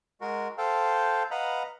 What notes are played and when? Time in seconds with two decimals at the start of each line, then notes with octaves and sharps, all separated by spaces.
0.21 G#3 F#4 A#4
0.58 A4 C5 F5 G5
1.31 B4 D#5 F5 F#5 A#5 B5